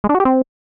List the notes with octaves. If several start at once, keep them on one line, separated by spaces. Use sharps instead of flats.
G#3
D4
F#4
G4
C4